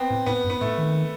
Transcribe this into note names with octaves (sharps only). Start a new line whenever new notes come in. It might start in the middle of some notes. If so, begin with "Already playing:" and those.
Already playing: B3 C4
A2
A2 B3
G2
B3
A2 A3
D#3